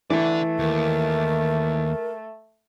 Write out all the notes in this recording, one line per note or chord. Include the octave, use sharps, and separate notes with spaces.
E3 A3 A4 D5
D#2 A#4